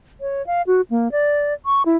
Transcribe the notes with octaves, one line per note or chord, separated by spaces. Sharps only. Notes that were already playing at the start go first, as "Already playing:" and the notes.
C#5
F5
F#4
A#3
D5
C#6
E4